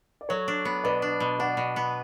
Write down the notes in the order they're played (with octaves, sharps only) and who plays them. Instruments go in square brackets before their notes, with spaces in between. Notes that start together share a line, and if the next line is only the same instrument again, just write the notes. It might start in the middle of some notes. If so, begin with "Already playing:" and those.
[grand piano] D5
[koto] F#3 [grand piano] A4 C#5
[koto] D4
B3
[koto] B2 [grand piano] B4 D5
[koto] D4
B2
[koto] D4 [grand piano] D5 F#5
[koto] B2
B3